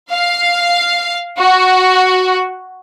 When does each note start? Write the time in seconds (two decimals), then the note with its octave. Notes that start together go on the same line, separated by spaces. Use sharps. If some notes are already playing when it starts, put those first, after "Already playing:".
0.12 F5
1.39 F#4